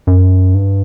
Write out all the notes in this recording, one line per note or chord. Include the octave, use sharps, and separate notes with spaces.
F#2
G2